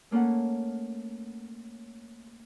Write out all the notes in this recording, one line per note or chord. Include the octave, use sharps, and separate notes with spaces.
A3 A#3 C#4 A4 F#5